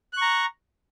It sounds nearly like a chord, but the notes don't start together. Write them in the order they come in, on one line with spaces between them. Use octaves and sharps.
F#6 C#6 A#5